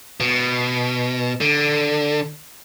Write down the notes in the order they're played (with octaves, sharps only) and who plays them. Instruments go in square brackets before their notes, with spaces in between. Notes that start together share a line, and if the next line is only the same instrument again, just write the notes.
[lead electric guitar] B2
D3